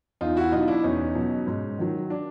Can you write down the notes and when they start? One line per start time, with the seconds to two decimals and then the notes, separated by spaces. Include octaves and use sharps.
0.21 E2 D#4 F4
0.37 E4 F#4
0.52 B2 F#3 D#4 F4
0.68 D4 E4
0.84 E2 C#4 D#4
1.15 B2 F#3
1.47 G#2
1.79 D#3 F#3
2.10 D4